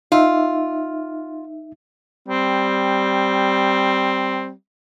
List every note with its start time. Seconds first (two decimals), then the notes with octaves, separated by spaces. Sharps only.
0.12 D#4 F4 E5
2.28 G3 C4